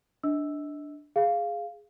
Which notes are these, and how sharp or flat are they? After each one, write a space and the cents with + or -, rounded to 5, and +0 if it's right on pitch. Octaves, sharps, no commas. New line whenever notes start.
D4 +0 D#5 +40 E6 +0
G#4 +0 F5 -5